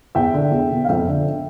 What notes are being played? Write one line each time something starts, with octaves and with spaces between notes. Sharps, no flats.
E2 E5 G5
D3
E2
B2
F5
F2 E5 G5
D3